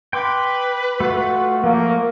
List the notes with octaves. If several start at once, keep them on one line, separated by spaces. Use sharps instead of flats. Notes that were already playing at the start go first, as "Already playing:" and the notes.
B4 G5 C6 D6
A3 F4 F#4
F3 F#3 A3 A#3